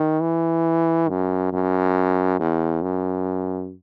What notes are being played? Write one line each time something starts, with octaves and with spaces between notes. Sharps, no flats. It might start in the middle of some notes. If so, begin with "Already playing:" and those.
Already playing: D#3
E3
F#2
F#2
E2
F#2